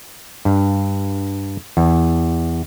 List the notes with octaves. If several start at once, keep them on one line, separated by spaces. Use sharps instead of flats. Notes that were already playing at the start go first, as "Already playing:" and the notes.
G2
E2